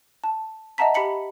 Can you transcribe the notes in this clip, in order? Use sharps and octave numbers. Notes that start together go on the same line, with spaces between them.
A5
D#5 E5 F#5 A5 A#5 B6
G4 B5 B6 C#7 F#7